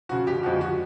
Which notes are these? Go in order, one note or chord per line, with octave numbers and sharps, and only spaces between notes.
C#3 F3 F#4
G1 G4
F2 D3 F3 G#3 F#4
F#4